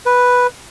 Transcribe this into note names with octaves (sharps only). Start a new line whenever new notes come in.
B4